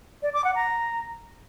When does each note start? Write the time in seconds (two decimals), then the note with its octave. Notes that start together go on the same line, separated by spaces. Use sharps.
0.23 D5
0.34 D6
0.44 F#5
0.55 A#5